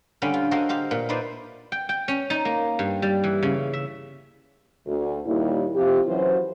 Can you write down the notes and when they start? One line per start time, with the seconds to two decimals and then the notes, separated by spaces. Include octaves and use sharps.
0.22 D3 G3 C#4 F5 G5 B5
0.34 F4
0.51 F#4 A4 A#4 C5 D#5 F5
0.69 G4 C5 F5
0.91 A#2
1.09 D#4 E4 B4 C5 D5
1.72 G5
1.89 G5
2.08 C#4
2.30 D#4
2.45 A#3
2.79 G2
3.02 G3
3.24 E3
3.43 C#3
3.73 E5
4.87 D2
5.26 D#2 A#2 G3 E4
5.75 C3 F3 F4 G4
6.08 F#2 E3 F#3 C5